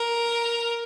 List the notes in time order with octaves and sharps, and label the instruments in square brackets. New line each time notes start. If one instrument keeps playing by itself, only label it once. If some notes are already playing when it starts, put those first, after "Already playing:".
Already playing: [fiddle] A#4